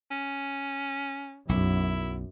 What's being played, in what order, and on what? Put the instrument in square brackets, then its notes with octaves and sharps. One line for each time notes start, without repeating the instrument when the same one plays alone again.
[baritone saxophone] C#4
[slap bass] B1 [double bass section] F#2 [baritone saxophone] E4